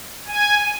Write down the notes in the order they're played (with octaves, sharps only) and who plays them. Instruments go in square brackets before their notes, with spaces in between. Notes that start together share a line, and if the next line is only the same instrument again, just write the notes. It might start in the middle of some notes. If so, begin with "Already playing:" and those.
[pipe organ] G#5